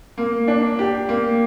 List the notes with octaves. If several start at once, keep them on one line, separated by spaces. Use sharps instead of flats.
A#3
D4
G4
A#3